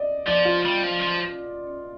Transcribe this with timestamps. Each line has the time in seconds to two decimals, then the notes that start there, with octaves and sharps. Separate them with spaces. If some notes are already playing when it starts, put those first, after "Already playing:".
Already playing: D5 D#5
0.26 F3 D5
0.45 F4
0.65 G3
0.83 F3
1.02 F3